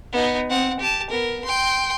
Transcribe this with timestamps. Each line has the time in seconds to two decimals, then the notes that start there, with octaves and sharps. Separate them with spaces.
0.12 B3 D#4
0.49 C4 F#5
0.80 G4 A5
1.10 B3 A#4
1.44 G5 C6